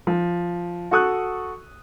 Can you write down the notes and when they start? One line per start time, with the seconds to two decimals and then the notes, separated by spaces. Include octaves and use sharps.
0.07 F3
0.91 F#4 A4 C#6 D#6 F#6